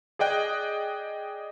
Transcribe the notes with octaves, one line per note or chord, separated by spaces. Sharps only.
G#4 D5 D#5 G5 F#6